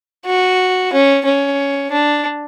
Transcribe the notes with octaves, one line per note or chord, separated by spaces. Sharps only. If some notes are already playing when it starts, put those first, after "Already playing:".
F#4
C#4
C#4
D4